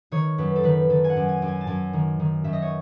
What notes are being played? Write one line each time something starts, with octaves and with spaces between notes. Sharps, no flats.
D#3 C#5
F#2 B4
A4
D#3 B4
D#3 A4
G#5
F#5
F#2
G#5
F#2
G#5
A5
F#2 G#5
D#3
D#3
F#2 E5
D#5
C#5